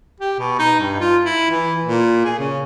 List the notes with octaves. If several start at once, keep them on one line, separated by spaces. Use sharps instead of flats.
G4
B2
D#4
G2
F4
E4
E3
A#2
G#4
C#3